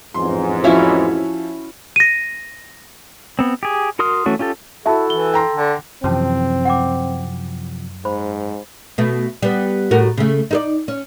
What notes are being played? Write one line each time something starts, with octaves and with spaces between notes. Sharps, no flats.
A1 F2 G#2 C6
F3 C#4 E4 F#4 C#5 E5
A#6 D#7
B3 C4
G4 G#4
F#4 A#4 C6 D#6 F6
E3 A3 C#4 F#4
C#4 F4 G4 A4
E4 F#4 A4 E5 A5
E3 G7
G5 A#5 C6
D3
F#2 C3 E3 F3 C4 C#4 A5
F#5 G5 D6
G#2 C5 B5
B2 A3
G3 B3
A2 F#4 A#4
C#3 A3
D#4 A4 D5
C#4